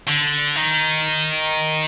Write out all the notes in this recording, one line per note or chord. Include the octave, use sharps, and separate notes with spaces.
D3
D#3